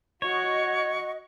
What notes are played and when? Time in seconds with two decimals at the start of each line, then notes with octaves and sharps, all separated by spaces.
0.22 F#4 C#5 D#5 F#5 C#6